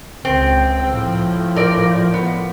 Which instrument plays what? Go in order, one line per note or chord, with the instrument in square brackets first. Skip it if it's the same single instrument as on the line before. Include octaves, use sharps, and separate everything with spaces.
[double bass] C#2 [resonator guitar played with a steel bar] C4
[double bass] A2 F3
[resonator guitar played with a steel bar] A#4 D5
B3